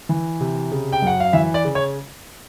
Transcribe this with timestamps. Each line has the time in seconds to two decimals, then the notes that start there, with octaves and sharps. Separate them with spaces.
0.09 E3
0.41 C3
0.72 C#3
0.93 G5
1.02 F#2 F#5
1.20 F5
1.33 E3 E5
1.54 D5
1.65 C#3
1.75 C#5